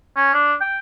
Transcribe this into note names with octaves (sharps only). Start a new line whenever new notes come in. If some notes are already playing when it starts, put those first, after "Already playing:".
C#4
D4
G5